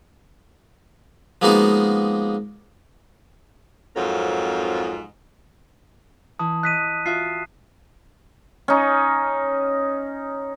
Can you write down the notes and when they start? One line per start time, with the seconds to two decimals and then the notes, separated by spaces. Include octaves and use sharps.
1.42 F3 G#3 A#3 B3 D#4 F#4
3.96 F2 G#2 F#3 C4 F4 A#4
6.39 E3 A5 D#6
6.63 D#5 F#6 B6 D#7
7.06 F4 F#4 E5 C7
8.68 C#4 D#4